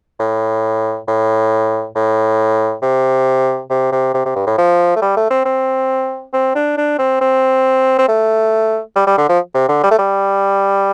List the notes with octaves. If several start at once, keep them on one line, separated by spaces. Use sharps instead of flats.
A2
A2
A2
C3
C3
C3
C3
C3
G2
A2
F3
A3
G3
A3
C4
C4
C4
D4
D4
C4
C4
C4
A3
G3
G3
D3
F3
C3
D3
G3
A3
G3